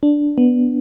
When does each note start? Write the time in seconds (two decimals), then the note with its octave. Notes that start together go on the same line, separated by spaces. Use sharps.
0.03 D4
0.38 B3